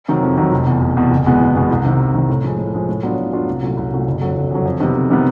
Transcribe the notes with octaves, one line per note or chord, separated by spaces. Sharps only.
C3 D#3 F#3
F2
C3 D#3 F#3
F1
E2 B2
F1
E2 B2
F#1
E2 B2 G#3 B3
F#1
E2 B2 G#3 B3
C2
C3 D#3
C2
C3 D#3
A2
F3 G#3
A2
F3 G#3
A2
F#3 B3 D4 F4
A2
F#3 B3 D4 F4
C2
A#2 F#3 A3 C#4
C2
A#2 F#3 A3 C#4
F#1
F2 D3 F#3
F#1
F2 D3 F#3
F2
C3 D#3 G3 B3
F2
C3 D#3 G3 B3